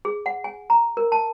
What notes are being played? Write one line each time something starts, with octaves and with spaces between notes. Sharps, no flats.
G#4
F#5
G#5
A#5
A#4
A5